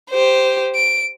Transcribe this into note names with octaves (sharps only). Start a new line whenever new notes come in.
G4 C5
D7